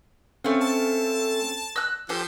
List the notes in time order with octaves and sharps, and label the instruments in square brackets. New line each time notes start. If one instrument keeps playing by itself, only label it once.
[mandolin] A3 F5 [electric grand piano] C4 C#4 A4
[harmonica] A5
[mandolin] E6 F#6 [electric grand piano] A#6
[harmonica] F3 [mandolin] G4 A4 C5